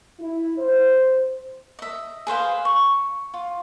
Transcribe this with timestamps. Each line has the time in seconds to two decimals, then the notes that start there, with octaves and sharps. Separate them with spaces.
0.19 E4
0.57 C5
1.79 D#5 E5
2.27 G#4 B4 C5 F5
2.65 C#6
3.34 F4